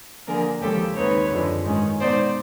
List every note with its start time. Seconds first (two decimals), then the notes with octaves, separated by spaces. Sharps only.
0.27 D3 F3 A#3 D4 G#4 A#4
0.62 D#2 C#3 F3 G#3 G4 A4
0.96 D#2 D#3 G#3 C4 D#4 B4 C#5
1.31 F#2 D3 F3 G#3
1.65 G#2 D#3 G#3 C#4
2.00 B2 G#3 B3 D#4 C5 D5